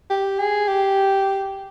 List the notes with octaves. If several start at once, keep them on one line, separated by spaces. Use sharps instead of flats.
G4
G#4
G4